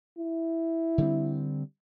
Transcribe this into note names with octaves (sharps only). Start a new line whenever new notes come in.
E4
D3 G3 C4